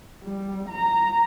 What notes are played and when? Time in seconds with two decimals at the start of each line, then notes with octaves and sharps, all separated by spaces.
0.24 G3
0.69 A#5